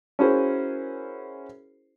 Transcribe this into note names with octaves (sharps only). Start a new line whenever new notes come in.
C#4 E4 F#4 G#4 A#4 C5